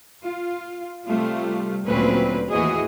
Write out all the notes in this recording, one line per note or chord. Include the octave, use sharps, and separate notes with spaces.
F4
C3 G3 A3 F4
D2 A#2 F#3 C4 C#4 B4
D#2 A2 E3 F#4 G#4 D#5